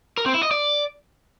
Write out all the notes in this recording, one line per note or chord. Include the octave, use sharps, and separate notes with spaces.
A#4
C4
E4
D#5
D5